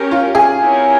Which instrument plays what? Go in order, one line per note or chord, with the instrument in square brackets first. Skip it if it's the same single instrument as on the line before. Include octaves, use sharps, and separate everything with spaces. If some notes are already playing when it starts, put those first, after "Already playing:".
Already playing: [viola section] C#4 G4 A#4
[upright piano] F4
G#4
[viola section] C4 E4 G4 A#4 C#5